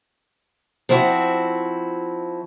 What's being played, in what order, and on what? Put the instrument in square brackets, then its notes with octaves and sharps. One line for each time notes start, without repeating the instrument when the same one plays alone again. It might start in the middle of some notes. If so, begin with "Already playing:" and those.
[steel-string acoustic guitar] F3 C4 E4 F#4